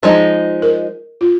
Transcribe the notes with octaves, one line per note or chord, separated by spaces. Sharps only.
F3 G#3 D#4 G#4
A#4
F4